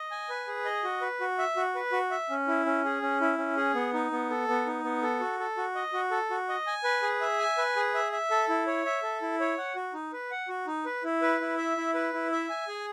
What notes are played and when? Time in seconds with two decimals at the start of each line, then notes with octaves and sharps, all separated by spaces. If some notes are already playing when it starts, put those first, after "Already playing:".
Already playing: D#5
0.11 G#5
0.30 B4
0.47 G#4
0.65 D#5
0.84 F#4
1.01 B4
1.21 F#4
1.38 E5
1.56 F#4
1.75 B4
1.92 F#4
2.11 E5
2.30 C#4
2.48 E4
2.66 C#4
2.84 G#4
3.02 C#4
3.21 E4
3.38 C#4
3.57 G#4
3.75 B3
3.94 D#4
4.11 B3
4.30 A4
4.48 B3
4.66 D#4
4.84 B3
5.02 A4
5.20 F#4
5.40 A4
5.57 F#4
5.75 D#5
5.93 F#4
6.11 A4
6.30 F#4
6.49 D#5
6.67 G#5
6.84 B4
7.02 G#4
7.21 E5
7.39 G#5
7.58 B4
7.76 G#4
7.94 E5
8.12 E5
8.31 A4
8.49 E4
8.67 C#5
8.85 E5
9.03 A4
9.22 E4
9.40 C#5
9.58 F#5
9.76 F#4
9.94 D#4
10.13 B4
10.31 F#5
10.48 F#4
10.67 D#4
10.86 B4
11.04 E4
11.22 B4
11.40 E4
11.58 E5
11.77 E4
11.94 B4
12.13 E4
12.32 E5
12.50 G#5
12.68 G#4